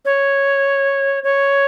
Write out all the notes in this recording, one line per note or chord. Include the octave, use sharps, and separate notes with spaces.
C#5
C#5